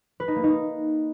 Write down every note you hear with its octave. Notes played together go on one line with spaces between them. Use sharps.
B4
D#4
A#3
D#4